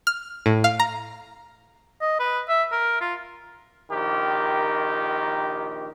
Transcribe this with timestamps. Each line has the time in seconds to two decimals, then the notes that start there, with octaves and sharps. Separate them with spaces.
0.07 F6
0.46 A2
0.64 F5
0.80 A#5
2.01 D#5
2.20 B4
2.49 E5
2.72 A#4
3.01 F4
3.91 A#1 D#3 G4 A#4